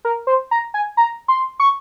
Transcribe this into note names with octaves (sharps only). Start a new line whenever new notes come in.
A#4
C5
A#5
G#5
A#5
C6
C#6